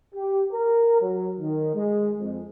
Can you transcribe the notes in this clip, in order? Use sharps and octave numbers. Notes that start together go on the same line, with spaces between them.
G4
A#4
F#3
D#3
G#3
F2